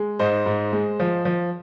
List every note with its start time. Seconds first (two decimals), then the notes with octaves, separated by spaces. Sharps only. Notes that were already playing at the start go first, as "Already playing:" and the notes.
Already playing: G#3
0.19 G#2 C5 D#5
0.46 G#2
0.72 G#3
1.00 F3
1.25 F3